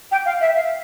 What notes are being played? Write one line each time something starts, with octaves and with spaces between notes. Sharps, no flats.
G5
F5
E5
F5